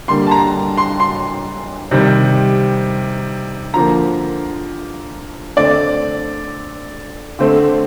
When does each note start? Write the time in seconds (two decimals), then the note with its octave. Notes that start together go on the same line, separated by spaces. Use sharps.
0.08 D3 G3 A#3 C6
0.27 A5
0.31 A#5
0.77 C6
1.00 C6
1.91 C3 D#3 G3
3.74 D3 F3 A#3 A#5
5.56 D3 A3 C4 D5
7.39 D3 A3 C4